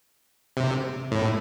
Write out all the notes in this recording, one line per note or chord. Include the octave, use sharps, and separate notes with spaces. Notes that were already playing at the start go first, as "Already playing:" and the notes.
C3
A2